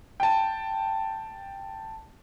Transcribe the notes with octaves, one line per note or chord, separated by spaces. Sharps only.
G5 A5